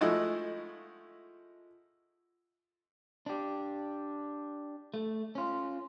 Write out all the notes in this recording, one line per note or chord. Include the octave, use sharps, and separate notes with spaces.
F3 G#3 A3 D#4 E4 F#4
D4 G4
A3
C#4 F4